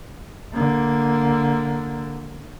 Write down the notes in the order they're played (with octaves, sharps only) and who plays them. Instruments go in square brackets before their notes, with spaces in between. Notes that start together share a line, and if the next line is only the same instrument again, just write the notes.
[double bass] D3 A#3